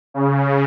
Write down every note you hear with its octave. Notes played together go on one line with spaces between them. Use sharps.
C#3